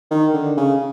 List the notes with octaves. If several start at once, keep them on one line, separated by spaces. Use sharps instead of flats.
D#3
D3
C#3